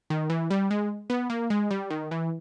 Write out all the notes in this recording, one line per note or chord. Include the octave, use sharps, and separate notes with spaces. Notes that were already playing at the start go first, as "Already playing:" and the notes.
D#3
E3
G3
G#3
B3
A#3
G#3
G3
D#3
E3